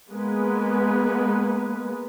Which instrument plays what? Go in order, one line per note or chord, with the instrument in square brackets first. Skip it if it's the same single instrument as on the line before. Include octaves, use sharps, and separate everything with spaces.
[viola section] G#3 A#3 B3 B4